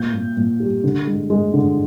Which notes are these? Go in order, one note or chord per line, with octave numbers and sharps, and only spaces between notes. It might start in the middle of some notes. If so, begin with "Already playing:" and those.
Already playing: A#2 G6
A#2
A#2
G3
D3
G#3
G#3
D3